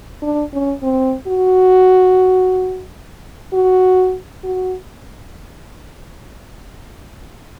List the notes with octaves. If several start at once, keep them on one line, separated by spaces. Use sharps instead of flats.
D4
C#4
C4
F#4
F#4
F#4